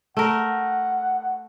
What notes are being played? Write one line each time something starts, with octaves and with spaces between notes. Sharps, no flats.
A3 A#4 F#5